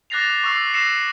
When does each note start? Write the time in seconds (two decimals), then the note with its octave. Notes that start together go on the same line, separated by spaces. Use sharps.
0.10 D6 F#6 A6 A#6 C7 F7
0.44 C#6 E6 C7
0.74 E6 A#6 C7 C#7 E7